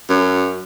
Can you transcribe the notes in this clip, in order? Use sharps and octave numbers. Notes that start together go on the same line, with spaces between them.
F#2